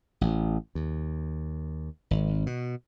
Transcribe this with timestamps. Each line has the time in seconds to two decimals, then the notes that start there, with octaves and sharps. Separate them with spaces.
0.21 A1
0.75 D#2
2.11 G#1
2.46 B2